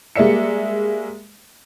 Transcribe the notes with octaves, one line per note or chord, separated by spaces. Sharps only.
G3 G#3 A#3 D5 E5 C#7